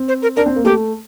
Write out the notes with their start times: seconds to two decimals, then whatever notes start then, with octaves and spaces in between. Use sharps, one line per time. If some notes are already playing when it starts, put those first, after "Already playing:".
Already playing: C4
0.08 C5
0.22 A#4
0.36 D4 A#4
0.46 C4
0.56 A#3
0.65 A3 G4